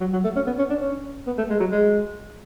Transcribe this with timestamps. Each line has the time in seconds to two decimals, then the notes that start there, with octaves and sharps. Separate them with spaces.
0.01 F#3
0.12 F#3
0.24 A3
0.36 C#4
0.47 B3
0.58 C#4
0.70 D4
0.81 C#4
1.27 B3
1.38 A3
1.50 G#3
1.60 F#3
1.71 G#3